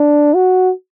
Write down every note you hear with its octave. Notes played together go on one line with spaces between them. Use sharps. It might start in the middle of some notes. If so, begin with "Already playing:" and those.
Already playing: D4
F#4